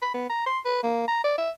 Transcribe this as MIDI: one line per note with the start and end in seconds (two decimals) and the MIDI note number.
0.02 0.10 83
0.14 0.29 59
0.30 0.46 82
0.46 0.59 84
0.65 0.81 71
0.83 1.03 58
1.08 1.24 82
1.24 1.33 74
1.38 1.50 76